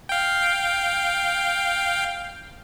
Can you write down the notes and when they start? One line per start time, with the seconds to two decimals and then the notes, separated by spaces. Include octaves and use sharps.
0.09 F5 G5